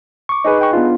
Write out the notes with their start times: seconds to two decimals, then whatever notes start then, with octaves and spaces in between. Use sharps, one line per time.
0.29 C#6 D6
0.44 D#4 G#4 B4
0.61 G5 C#6
0.73 B3 D4 F4